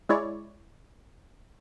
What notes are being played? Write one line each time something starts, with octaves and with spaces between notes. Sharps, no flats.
G#3 E4 C#5 D5